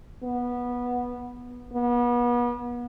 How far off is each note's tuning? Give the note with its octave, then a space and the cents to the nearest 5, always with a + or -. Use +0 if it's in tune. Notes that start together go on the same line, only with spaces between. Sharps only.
B3 -15
B3 -35